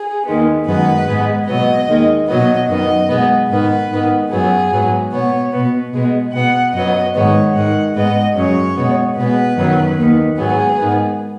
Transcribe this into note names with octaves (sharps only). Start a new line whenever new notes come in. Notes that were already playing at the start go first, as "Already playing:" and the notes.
Already playing: G#4
D#2 D#3 G#3 B3
F#2 D#3 G#3 B3 B4
G#2 G#3 B3
B2 F#3 B3 D#5
D#2 D#3 G#3
B2 F#3 B3 D#5
F#2 D#3 B3 D#5
B2 G#3 B3
G#2 D#3 B3 B4
G#2 D#3 B3
F#2 F#3 B3 G#4
G#2 F#3 B3
B2 B3 C#5
B2 B3
B2 G#3 B3
B2 B3 F#5
F#2 F#3 B3 D#5
G#2 D#3 G#3 B3 C#5
G#2 D#3 G#3 F#5
G#2 G#3 B3 D#5
F#2 C#3 F#3 C#5
B2 G#3 B3
B2 G#3 B3 B4
F#2 D#3 F#3 B3
D#2 D#3 B3
G#2 F#3 B3 G#4
G#2 D#3 B3